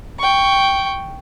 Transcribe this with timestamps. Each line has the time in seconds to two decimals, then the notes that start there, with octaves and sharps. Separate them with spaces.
0.19 G5 C#6